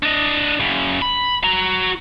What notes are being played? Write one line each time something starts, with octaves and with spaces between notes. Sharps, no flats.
D4 D#5
F#2 C#3
B5
F#4 A#5